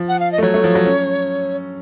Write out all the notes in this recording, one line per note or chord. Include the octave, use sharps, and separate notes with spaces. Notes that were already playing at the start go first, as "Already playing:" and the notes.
Already playing: F3
F#5
F5
D#5
A3
F#3 C#5
A3
F3
F#3
C#4